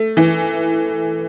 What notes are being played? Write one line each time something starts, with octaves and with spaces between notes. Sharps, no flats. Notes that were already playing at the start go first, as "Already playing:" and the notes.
Already playing: A3
E3